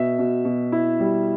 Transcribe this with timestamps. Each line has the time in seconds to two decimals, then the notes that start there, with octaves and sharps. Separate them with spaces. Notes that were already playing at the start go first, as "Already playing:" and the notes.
Already playing: B2 E5
0.19 B2
0.45 B2
0.72 E4
1.00 G3